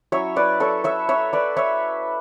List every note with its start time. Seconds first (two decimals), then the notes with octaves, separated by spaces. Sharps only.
0.12 F#3 C#4 E4 C#5 E5
0.36 B4 D5
0.60 A4 C#5
0.84 C#5 E5
1.09 C#5 E5
1.33 B4 D5
1.57 C#5 E5